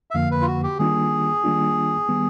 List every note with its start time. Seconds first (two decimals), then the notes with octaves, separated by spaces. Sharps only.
0.11 E5
0.14 F2 D3 F3 A#3 F5
0.31 B4
0.41 F4
0.47 F#4
0.63 G4
0.79 D#3 G3 A#3 D4 F4 G#4
1.44 D#3 G3 A#3 D4 F4
2.09 D#3 G3 B3